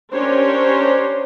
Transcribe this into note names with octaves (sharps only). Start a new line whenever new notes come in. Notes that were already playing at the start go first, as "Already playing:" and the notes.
C#4 D4 G4 A#4 C5 C#5